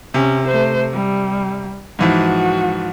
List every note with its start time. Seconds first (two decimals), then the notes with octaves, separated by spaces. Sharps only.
0.14 C3 C#4
0.47 A3 C5
0.93 G3
1.99 G#2 E3 F3 F#4